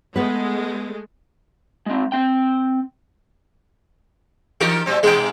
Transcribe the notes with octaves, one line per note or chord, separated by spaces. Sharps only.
G#3 A3 B3 B4
G#3 C4
C4 G5
E3 D#4 G4 A#4
A#2 G3 C4
G#2 B2 G#3 G5